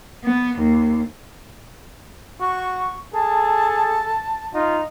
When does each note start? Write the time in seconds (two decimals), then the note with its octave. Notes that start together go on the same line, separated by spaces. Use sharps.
0.24 B3
0.59 D#2
2.40 F#4 C#6
3.14 G#4 A4 A5
4.54 D#4 F4